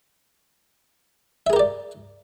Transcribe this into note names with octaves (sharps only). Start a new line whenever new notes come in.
G4 G#4 A#4 D5 E5